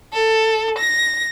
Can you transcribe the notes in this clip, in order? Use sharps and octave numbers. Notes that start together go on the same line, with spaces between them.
A4
A#6